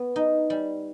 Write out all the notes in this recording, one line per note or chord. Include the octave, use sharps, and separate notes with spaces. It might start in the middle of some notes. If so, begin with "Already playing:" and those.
Already playing: B3
D#4
G3